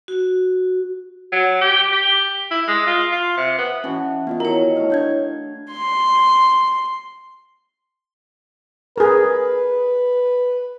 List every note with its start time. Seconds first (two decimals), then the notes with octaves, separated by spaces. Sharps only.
0.08 F#4
1.32 F#3
1.61 G4
1.92 G4
2.51 E4
2.68 G#3
2.87 F4
3.12 F4
3.37 C3
3.58 B3
3.84 E3 C#4 F#4 A4
4.27 B3 F4 D#5
4.40 D#3 E4 F#4 A#4 C#5 A#5
4.76 A3 F5
4.90 D4 G6 G#6
5.72 C6
8.98 G#4 A#4 B4